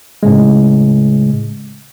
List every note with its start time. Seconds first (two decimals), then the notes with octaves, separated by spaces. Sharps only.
0.23 A2 C#3 G#3